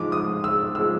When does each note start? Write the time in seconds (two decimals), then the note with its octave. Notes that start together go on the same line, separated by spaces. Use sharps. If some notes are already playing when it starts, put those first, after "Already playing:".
Already playing: G#2 F3 G#3 D6
0.12 D#6
0.44 E6
0.75 F3 G#3 E6